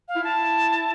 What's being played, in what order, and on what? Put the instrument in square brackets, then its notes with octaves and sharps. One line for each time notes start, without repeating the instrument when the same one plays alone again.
[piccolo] F5
[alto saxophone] E4
[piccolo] A5